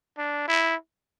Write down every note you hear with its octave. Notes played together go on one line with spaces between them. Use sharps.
D4
E4